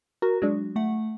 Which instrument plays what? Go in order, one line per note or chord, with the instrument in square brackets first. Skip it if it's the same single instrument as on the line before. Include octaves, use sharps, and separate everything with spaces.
[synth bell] F#4 [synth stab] A#4
[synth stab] F#3 G#3 D4
[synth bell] A3 F#5